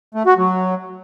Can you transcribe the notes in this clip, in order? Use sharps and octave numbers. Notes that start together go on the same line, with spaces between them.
A3
F#4
F#3